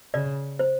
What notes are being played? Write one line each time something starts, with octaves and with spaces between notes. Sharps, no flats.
C#3 D5
C5